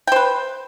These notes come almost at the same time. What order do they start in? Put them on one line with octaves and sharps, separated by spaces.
G5 C5 B4